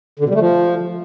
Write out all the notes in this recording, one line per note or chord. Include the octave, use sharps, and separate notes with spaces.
D3
B2
G3
A3
F3